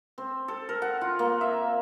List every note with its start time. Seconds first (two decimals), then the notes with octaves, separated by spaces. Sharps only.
0.18 C4
0.48 A4
0.69 A#4
0.82 F#5
1.01 F4
1.19 A#3
1.41 E5